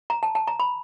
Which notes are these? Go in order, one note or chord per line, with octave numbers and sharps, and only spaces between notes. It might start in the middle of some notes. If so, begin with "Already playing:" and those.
A#5
A5
A5
A#5
B5